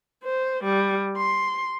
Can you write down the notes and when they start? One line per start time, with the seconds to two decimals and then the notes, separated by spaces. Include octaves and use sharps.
0.24 C5
0.64 G3
1.17 C6